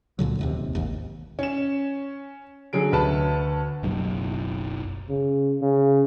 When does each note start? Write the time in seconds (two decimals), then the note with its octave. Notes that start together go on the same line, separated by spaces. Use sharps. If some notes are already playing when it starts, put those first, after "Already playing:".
0.19 C#2 A#2 D3 F#3
0.39 D1 D#2 C3
0.75 G#1 D#2
1.39 C#4 E7
2.73 D3 F#3 G#4 D7
2.92 D2 B4 A5
3.83 F#1 B1 F#2
5.09 C#3
5.62 C#3